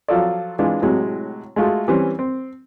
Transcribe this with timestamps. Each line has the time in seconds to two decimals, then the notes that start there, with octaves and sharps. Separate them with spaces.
0.08 F3 F#3 F4 A4 D5
0.59 E3 G#3 D4 F4
0.82 A2 C3 F#3 G#3
1.56 G#3 A3 F4 F#4 G#4
1.88 E3 G3 C4 C#4
2.19 C4